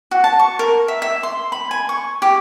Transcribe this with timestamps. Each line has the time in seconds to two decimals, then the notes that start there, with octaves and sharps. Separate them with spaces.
0.11 F#4
0.24 A5
0.39 C#6
0.59 A#4
0.88 E5
1.02 E5
1.23 C6
1.52 B5
1.71 G#5
1.89 C#6
2.22 G4